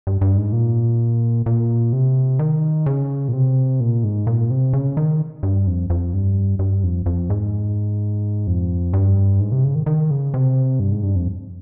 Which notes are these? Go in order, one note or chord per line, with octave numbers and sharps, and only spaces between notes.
G2
G2
G#2
A#2
A#2
C3
D#3
C#3
A#2
C3
A#2
G#2
A#2
C3
C#3
D#3
G2
F2
F2
G2
G2
F2
F2
G#2
F2
G2
G#2
C3
C#3
D#3
D#3
C#3
C3
G2
G#2
G2
F2